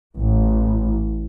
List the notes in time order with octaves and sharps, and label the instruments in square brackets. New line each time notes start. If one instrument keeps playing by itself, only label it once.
[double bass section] A1